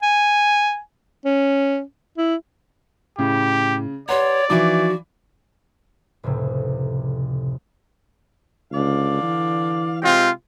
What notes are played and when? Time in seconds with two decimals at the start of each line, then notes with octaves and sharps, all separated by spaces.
0.03 G#5
1.25 C#4
2.18 E4
3.19 A2 C#3 E4 G4
4.09 G4 B4 C#5 D5 F#5 A#5 C6
4.50 E3 F3 D#4 F#4 F5 D6
6.23 F1 C#2 A2 C3
8.72 C#2 D3 D5 F5
9.23 E3
10.02 C3 G#3 C4 F4 G4